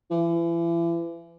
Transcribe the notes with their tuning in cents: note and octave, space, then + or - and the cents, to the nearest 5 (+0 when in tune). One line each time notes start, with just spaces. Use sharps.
E3 +35